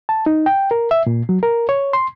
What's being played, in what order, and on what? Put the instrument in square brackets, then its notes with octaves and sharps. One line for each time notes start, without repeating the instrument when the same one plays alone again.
[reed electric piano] A5
D#4
G5
A#4
E5
A#2
F#3
A#4
C#5
C6